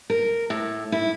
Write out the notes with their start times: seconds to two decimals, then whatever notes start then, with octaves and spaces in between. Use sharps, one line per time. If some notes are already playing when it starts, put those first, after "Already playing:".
0.10 A#4
0.50 A2
0.92 E4